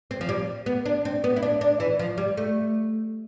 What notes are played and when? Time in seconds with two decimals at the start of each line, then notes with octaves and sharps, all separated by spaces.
0.11 C4
0.21 F3
0.29 G3
0.66 B3
0.85 D4
1.05 C4
1.24 B3
1.36 E4
1.43 D4
1.61 D4
1.80 E3
1.99 F3
2.18 G3
2.37 A3